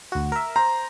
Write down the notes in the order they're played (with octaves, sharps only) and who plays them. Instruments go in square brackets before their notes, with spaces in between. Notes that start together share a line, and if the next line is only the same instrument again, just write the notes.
[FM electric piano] D2 F#4
A#4 E5
[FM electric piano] C5 [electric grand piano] A#5